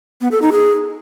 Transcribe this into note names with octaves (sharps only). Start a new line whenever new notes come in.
B3
A4
D#4
G#4